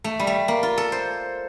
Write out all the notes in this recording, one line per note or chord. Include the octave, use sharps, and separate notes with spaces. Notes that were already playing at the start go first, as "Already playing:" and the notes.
A3
G3
A3
A#3
F4
A4
C5